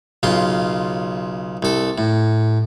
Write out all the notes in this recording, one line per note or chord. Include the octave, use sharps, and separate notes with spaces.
B1 C#3 F4 C6
C2 A4
A2